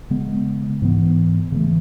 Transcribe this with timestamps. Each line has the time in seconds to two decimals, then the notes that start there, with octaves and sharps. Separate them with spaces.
0.10 C#3 G#3 B3
0.82 G#2 E3 B3
1.52 C#3 E3 A3